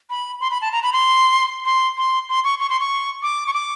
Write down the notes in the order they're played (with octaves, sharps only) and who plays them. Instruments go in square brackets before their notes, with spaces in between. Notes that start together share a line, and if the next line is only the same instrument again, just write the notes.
[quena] B5
C6
B5
A5
A#5
B5
C6
C6
C6
C6
C#6
C#6
C6
C#6
D6
C#6
D6